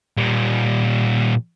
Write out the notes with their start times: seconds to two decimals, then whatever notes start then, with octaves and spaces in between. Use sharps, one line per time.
0.17 A#2 G3